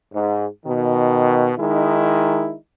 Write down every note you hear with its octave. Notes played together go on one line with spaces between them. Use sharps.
G#2
B2 D#3
D#3 G#3 D#4 E4